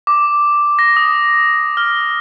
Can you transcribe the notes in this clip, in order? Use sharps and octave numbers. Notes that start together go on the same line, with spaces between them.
D6
A#6
D#6
F6